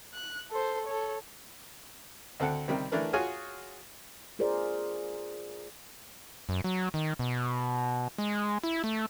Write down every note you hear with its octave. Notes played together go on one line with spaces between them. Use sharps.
F#6
A4 C5
A4 C#5
D2 C4 A4 F#5
C3 D#3 G3 C4
E3 A3 D4 A#4 B4
F4 F#4 G#4 C#5 G#5 F6
F4 G#4 A#4 C5 D5
F#2
F#3
D#3
B2
G#3
E4
A3